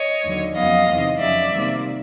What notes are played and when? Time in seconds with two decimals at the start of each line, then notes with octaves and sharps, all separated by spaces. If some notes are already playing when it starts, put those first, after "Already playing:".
Already playing: C#5 D#5
0.23 D#2 D3 F#3
0.55 F2 C#3 F#3 B3 D#5 F5
0.88 E2 C3 D#3
1.19 F2 C#3 F#3 D5 E5
1.52 C3 D#3 G3 A#3